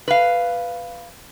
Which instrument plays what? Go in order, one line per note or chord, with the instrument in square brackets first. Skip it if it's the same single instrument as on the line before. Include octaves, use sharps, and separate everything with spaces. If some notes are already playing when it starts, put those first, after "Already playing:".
[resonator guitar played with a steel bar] B4 F5